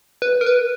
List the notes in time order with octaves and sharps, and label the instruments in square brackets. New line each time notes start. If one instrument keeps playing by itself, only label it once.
[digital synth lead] B4
A#4
B4